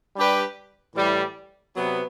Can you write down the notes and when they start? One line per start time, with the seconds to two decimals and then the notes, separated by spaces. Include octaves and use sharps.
0.16 G3 D4 G4 B4
0.96 A2 E3 G3
1.76 C3 F#3 B3